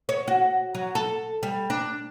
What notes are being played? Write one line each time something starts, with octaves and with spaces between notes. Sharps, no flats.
C#5
F#4
F#3
A4
G3
D4